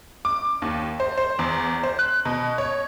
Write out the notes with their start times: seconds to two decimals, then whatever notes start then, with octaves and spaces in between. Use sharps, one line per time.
0.25 D6
0.62 D#2
1.00 C5
1.18 C5
1.39 E2
1.83 C5
1.99 F#6
2.25 B2
2.58 C#5